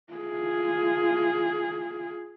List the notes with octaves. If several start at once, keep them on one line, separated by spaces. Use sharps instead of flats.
F4 G#4